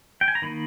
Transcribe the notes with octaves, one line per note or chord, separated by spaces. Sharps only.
G5
G#5
A#5
D#3 A#3 D#4 B5